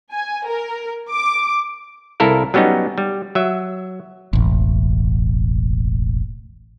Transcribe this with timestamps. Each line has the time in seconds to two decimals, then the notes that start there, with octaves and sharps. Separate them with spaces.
0.13 G#5
0.47 A#4
1.09 D6
2.20 C2 E4 A4 A#4 F5
2.54 F#3 G3 B3 C#4 D#4
2.98 G3
3.35 F#3 E5
4.33 E1 A1